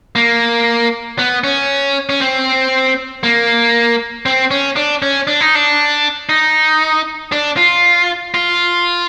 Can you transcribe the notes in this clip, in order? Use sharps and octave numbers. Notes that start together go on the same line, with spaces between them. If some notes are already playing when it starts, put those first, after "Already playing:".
A#3
B3
C#4
C#4
C4
A#3
C4
C#4
D4
C#4
D4
D#4
D4
D#4
D4
F4
F4